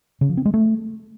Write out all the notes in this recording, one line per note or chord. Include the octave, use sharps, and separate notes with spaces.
C#3
F3
C4
G#3
A3